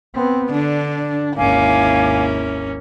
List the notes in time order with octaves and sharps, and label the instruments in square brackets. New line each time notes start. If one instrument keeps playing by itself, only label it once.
[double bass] B3 C4
[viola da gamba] D3 [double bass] D4
[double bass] G#1 D#2 [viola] A#3 C#4 [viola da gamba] E4 [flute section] F5 G#5 D6